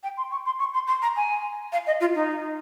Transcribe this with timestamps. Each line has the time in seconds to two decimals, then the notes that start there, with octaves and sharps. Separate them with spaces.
0.03 G5
0.17 C6
0.31 C#6
0.46 C6
0.60 C#6
0.74 C6
0.87 C6
1.02 A#5
1.16 G#5
1.72 F5
1.87 D#5
2.00 F4
2.15 D#4